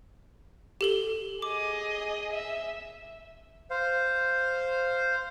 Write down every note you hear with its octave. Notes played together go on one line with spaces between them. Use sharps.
G4 A4 G7
G#4 D#5 D6
E5
C5 F5